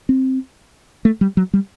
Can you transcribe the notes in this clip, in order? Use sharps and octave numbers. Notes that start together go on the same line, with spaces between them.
C4
A3
G3
F#3
G3